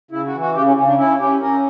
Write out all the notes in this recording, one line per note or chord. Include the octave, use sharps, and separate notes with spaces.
C#3 E4
F#4
E3
F#4
C#3 G4
C#4
C#3 C#4
D4
C#4 E4
C#4 G4
C#4 A#4